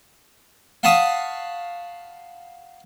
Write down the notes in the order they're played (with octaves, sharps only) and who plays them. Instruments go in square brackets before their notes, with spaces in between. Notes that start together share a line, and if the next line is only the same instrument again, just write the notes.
[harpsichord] F5 F#5 A5 B5 C#6 D#6